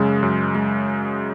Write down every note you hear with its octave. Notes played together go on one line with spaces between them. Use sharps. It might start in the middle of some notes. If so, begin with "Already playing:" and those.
Already playing: F#2 C#3 G#3
F#2
G#3